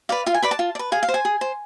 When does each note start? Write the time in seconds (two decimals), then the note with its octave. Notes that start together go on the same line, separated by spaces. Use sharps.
0.09 B4 D5 F5
0.26 F4 F5
0.34 G#5
0.42 B4 D5 B5
0.51 A5
0.59 F4
0.75 D5
0.79 B4
0.92 G#4 F5
1.03 F5
1.09 C5
1.14 G#5
1.25 G#4
1.41 C5